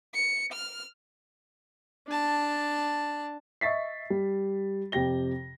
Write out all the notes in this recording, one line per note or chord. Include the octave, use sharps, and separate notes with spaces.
C#7
F6
D4 A5
D#5 E5 C#6 A6 B6 C7
G3
F2 C3 G4 G5 A#6 G7